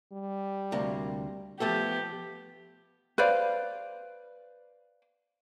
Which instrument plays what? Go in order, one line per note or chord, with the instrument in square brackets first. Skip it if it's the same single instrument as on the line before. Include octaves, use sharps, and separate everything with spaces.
[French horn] G3
[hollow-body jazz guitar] D2 C3 A#3
[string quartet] F3 G4 [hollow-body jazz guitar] A3 B3 A4
[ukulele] B4 C5 D5 F5